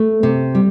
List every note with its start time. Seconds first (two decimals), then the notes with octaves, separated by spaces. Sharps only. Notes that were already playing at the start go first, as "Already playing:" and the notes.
Already playing: A3
0.23 C3
0.55 G3